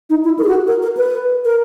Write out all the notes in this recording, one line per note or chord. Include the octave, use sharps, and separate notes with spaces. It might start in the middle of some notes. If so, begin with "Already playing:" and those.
D#4
E4
A#4
G#4
F#4
A#4
A#4
B4
A#4